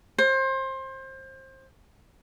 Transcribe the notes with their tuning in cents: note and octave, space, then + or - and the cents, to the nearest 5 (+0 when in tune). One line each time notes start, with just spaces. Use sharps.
C5 +25